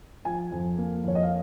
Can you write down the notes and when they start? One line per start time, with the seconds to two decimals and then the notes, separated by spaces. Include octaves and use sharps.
0.25 F3 G#5
0.52 F2
0.78 A#3
1.04 F2 C#5
1.15 D#5
1.23 F5